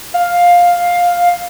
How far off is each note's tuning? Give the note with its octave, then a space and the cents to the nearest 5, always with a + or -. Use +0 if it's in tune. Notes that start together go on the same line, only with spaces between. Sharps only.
F5 +10